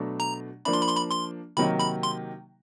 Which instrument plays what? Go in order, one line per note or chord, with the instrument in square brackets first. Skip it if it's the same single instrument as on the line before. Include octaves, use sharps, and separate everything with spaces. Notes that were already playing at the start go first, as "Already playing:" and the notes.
Already playing: [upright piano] B2 F#3 A3 D4
[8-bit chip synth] A#5
[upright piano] F3 A#3 D4 [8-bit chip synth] B5
[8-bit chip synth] C6
B5
C6
B5
C6
[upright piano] C3 D#3 F#3 A#3 D#4 [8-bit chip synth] B5
[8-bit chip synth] B5
C6